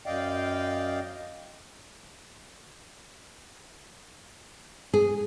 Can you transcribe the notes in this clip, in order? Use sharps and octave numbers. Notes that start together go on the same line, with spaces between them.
F#2 D5 D#5 F5 G5
G#4